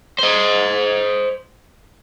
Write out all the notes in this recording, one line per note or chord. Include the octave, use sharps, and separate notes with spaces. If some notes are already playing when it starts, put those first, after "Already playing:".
C5 D#5